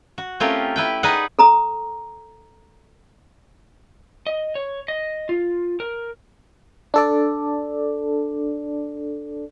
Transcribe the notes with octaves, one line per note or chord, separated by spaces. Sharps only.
F#4
A3 C4 C#4 F4 G4 A#4
E4 B4 G5
D#4 G#4 B4 D5 D#5 F#5
A4 A#5 D#6
D#5
C#5
D#5
F4
A#4
D4 A4 D5